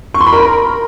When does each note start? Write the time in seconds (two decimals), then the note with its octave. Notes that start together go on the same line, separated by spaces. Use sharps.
0.14 C#6
0.20 C6
0.27 B5
0.33 A#4